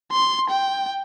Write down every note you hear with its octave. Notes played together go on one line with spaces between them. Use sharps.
C6
G5